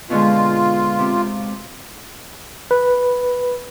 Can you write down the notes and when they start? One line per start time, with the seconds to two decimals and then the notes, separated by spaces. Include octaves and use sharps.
0.10 B2 D3 G#3 F4
0.99 C3
2.71 B4